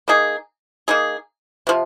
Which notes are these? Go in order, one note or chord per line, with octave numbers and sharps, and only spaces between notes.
A#3 D#4 G#4
A#3 D#4 G#4
C3 F3